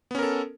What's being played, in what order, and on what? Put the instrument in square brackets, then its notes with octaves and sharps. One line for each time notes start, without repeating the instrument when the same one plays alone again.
[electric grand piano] B3
C#4
A#4
A4